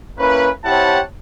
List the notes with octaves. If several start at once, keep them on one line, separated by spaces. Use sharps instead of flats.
A#3 C#4 E4 B4
C4 E4 G4 C#5 F#5 A5